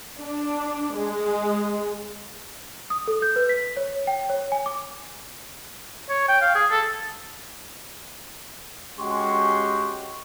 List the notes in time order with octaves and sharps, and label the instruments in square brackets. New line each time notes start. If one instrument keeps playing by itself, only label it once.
[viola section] D4
G#3
[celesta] D#6
A4
G6
B4
B6
C#5
G5
C#5
G#5
D6
[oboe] C#5
G5
F5
G#4
A4
[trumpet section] G#3 C#4 F#4 G4 C6 C#6